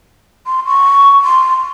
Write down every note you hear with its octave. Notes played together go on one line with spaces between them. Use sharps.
C6
C#6
C6